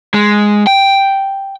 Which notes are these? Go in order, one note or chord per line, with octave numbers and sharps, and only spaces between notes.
G#3
G5